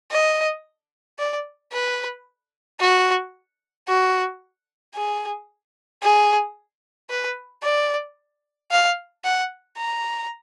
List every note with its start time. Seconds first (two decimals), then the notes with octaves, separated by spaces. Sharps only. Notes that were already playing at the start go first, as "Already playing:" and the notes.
0.11 D#5
1.19 D5
1.72 B4
2.80 F#4
3.88 F#4
4.94 G#4
6.02 G#4
7.10 B4
7.63 D5
8.71 F5
9.24 F#5
9.78 A#5